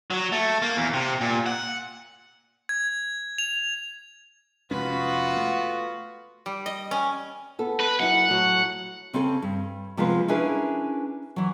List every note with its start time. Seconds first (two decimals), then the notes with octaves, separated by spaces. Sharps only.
0.11 F#3
0.32 A3
0.62 A#3
0.77 E2
0.93 C3
1.21 A#2
1.46 F#5
2.69 G#6
3.38 F7
4.71 F1 G#3 B3 C#4 F4 F#4 B4
5.37 A3
6.46 G3
6.66 D#5
6.91 C#4
7.59 B3 A4
7.80 B4
8.00 F#2 E4 F#5
8.28 A2 F#3
9.13 C#3 C4 C#4 A4
9.42 G2
9.97 C3 F3 G#3 B3 F4 B4
10.28 C#4 D4 E4 G#4 A#4 B4
11.36 E3 F#3